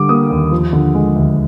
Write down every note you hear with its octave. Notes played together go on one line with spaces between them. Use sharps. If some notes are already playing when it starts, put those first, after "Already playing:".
Already playing: D3 G3 D6
A#3 D#6
D#2
F3
D3
G#3
D2